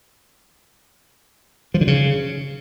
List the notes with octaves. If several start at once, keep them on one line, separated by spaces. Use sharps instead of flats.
F3
D3
C#3